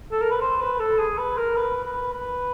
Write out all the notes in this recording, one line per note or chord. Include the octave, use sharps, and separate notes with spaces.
A4
A#4
B4
C5
B4
A4
G#4
B4
A#4
B4
B4
B4